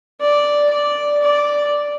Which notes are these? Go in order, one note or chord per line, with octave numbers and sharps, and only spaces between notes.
D5
D5
D5